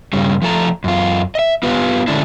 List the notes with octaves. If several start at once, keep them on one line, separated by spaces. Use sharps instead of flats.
G2 C#3 G3
F3 A3 A4 A#5
F#2 F4
D#5 E5
B3 F4 G4 B4 F5
D3 G#3 A3 C#4 D4 E4